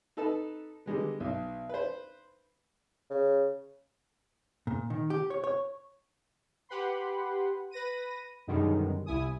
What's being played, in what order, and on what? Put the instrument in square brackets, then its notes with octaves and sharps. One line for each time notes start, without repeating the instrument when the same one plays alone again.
[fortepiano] D#4 A4 B4 A5
D3 G3 G#3 B3
B1
B4 C5
[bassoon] C#3
[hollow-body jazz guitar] A#2
D#3
G4
C#5
C#5
[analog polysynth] G4 B4 F#5 B5 C6
B4 A#6 D#7
F#2 B2 D3 D#3 G3 G#3
C2 E4 G#5 D#6